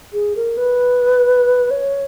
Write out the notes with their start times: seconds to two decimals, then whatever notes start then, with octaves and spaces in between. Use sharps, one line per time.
0.13 G#4
0.36 A#4
0.57 B4
1.71 C#5